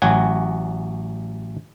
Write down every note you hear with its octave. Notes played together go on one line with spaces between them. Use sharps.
A1 F#3 F#4 G#5